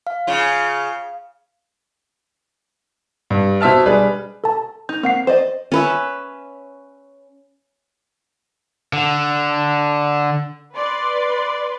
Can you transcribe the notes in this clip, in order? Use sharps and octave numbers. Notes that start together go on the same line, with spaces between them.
F5
C#3 F4
G2
B2 C5 E5 A5 F6
G3 D4 G#4 B4
A4 A5
D#4 G6
A#3 C4 F#5 C7
C5 D5 D#5
C#4 B4 E5
D3
B4 D5 C6